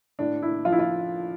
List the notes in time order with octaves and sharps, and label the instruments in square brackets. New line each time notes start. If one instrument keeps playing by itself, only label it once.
[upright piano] A2 D4
E4
F3 F4
E4
F4